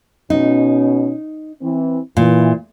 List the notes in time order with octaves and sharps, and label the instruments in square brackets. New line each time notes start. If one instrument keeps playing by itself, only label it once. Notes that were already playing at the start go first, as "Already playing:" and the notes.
[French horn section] B2 C#4 [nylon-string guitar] D#4
[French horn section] E3 C4
[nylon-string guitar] A#2 [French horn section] E3